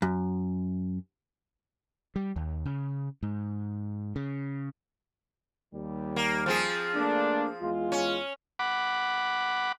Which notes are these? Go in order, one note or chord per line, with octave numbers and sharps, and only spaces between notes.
F#2
G3
D#2
C#3
G#2
C#3
D#2 G3
A#3
F3 C4 G#4
A3 A#3 D4
E2 G#3 F4
C#4
F#5 B5 D6